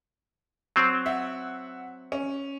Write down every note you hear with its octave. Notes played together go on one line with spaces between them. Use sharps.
F#3 C4
E5 F#5
C#4